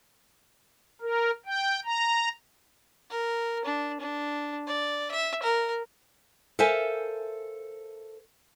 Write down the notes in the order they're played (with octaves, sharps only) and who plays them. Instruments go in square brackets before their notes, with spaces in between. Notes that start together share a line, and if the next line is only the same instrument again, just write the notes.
[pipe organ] A#4
G5
A#5
[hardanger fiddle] A#4
D4
D4
D5
E5
A#4
[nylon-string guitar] A4 A#4 C5 E5 F5 G#5